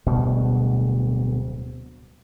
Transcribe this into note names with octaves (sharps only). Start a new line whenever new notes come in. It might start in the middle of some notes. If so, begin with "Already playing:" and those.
D1 D2 B2 G3